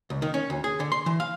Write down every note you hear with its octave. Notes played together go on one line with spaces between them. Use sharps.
C#2
D#3
C#4
D2
G#4
D3
C6
E3
F5